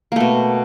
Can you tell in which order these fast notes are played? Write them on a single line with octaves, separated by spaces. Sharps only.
A#3 A3 B2